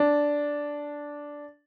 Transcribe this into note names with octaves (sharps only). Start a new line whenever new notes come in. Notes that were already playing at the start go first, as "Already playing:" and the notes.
Already playing: D4